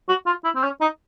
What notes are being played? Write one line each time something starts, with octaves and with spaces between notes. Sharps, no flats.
F#4
F4
E4
C4
C#4
D#4